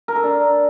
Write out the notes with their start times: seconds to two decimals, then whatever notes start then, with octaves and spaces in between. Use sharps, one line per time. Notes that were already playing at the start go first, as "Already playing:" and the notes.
0.08 A#4
0.16 A4
0.23 D4